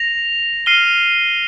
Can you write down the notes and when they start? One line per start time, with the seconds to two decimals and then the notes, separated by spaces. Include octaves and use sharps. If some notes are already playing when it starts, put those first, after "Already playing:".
Already playing: A#6 F7
0.66 F6 C7 D#7 G7